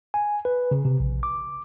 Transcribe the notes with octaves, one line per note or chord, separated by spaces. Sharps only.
G#5
B4
C#3
C3
A#1
D6